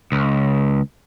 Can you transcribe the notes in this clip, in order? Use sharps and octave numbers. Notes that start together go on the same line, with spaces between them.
C#2